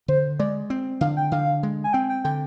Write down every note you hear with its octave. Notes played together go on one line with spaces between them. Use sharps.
D3 C5
G#3 D5
C4
D3 F5
G5
D3 F5
G#3
G#5
C4 G5
G5
D3 G5